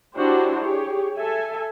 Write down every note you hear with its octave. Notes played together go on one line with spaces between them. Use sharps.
D4 E4 F#4 G4 C5 C#5
G4 G#4 C#5
A4 E5 G#5